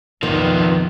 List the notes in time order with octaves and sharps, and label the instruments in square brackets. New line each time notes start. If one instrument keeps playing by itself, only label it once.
[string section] B1 F2 [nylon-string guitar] D#3 [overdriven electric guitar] F3 B3